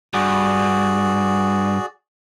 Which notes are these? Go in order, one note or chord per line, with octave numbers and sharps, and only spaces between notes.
G2 F#4 G#4 D5